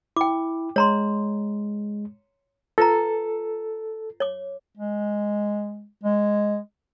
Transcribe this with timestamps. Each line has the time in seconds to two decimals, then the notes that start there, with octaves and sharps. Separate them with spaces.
0.17 E4 G5 D6
0.76 G#3 C#5 A#5 C6
2.78 F4 A4 B4 A#5
4.20 C#5 D6
4.77 G#3
6.03 G#3